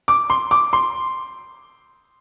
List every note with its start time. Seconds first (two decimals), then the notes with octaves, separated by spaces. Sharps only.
0.08 D6
0.30 C6
0.51 D6
0.73 C6